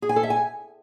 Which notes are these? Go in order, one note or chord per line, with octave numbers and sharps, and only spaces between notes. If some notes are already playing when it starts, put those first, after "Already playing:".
G#4
G#5
A4
E5
G#5